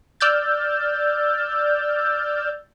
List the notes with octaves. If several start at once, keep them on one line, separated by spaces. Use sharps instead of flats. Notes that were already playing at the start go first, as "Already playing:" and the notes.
D5 E6 F6 G6 A6